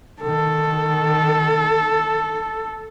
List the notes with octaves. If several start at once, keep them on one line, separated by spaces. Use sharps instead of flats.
D#3 A4